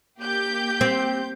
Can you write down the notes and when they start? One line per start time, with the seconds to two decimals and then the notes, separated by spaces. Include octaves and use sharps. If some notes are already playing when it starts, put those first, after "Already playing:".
0.19 A#3 G4 G6
0.81 C4